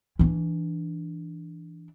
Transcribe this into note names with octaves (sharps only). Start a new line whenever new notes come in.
E3 D4